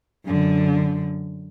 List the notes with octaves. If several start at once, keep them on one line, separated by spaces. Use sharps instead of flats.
F#2 D3